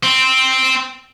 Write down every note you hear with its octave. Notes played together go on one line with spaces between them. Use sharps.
C4